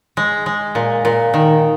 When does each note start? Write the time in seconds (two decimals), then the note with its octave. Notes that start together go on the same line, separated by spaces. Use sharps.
0.17 G#3
0.46 G#3
0.75 A#2
1.05 A#2
1.34 D#3